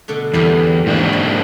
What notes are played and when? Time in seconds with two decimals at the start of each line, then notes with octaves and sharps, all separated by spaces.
0.08 B2 D3 A3
0.34 E2 G3 G4 A#4
0.86 G#2 A#3 D4
1.13 G3